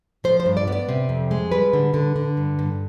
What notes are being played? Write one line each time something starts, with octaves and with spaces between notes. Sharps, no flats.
F3 C5
C5
G2
D5
B3
D5
C3
F2
G#3
G3 B4
D3
D3
D3
G2
G2